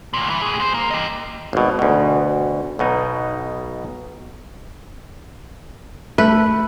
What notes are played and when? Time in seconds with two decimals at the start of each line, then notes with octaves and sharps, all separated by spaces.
0.14 D2 A#2
0.30 E3
0.42 A2 G#4
0.60 G#2 C5
0.74 A#3
0.91 G4 D#5
1.53 G#1 B2
1.79 D2 B2
2.79 B1 B2 D#4
6.18 A3 B4